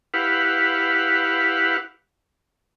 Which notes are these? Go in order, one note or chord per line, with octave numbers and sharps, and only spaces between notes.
E4 G4 B4 F5 F#5